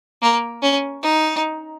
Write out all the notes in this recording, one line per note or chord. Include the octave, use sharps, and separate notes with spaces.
A#3
C#4
D#4